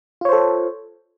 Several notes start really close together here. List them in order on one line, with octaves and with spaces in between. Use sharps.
F4 C#5 C5 A4